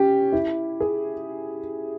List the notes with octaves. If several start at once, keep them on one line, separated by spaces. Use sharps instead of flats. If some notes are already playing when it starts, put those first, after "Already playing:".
Already playing: C#4 G4
E4
G#4